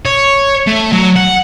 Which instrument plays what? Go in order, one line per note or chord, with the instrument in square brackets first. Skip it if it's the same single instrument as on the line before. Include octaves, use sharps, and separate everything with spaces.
[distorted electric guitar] C#5
A3
F#3
F#5